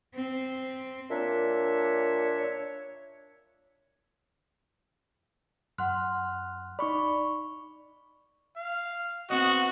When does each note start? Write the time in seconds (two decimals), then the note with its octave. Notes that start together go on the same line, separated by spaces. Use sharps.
0.14 C4
1.10 A#2 D4 C#5 E5
5.78 F#2 F#5 C6 F6 F#6
6.79 D#4 D5 B5 C#6
8.56 F5
9.30 B3 C4 F#4 D#5